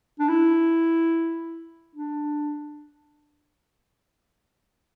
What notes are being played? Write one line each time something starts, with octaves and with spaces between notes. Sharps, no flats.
D4
E4
D4